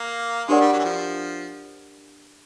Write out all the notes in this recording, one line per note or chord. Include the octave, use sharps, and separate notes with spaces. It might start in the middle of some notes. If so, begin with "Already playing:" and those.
Already playing: A#3
G#3 D4 G4 A#4 D5 F#5
G3
F#3
E3
F3